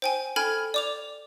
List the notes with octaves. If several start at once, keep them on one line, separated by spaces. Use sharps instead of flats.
C5 G5 G#5
A4 G5 G#5 B5 F6 G#6
D5 D6 F7